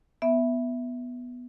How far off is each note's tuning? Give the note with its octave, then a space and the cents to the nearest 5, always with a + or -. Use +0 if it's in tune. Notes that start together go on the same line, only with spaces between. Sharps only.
B3 +0 E5 +0